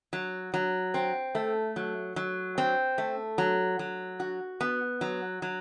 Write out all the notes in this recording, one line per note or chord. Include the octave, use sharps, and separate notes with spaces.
F#3
F#3
C4
A3
F#3
F#3
C4
A3
F#3
F#3
F#4
B3
F#3
F#3